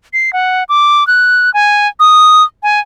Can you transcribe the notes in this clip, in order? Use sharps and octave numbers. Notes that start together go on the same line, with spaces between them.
C7
F#5
D6
F#6
G#5
D#6
G#5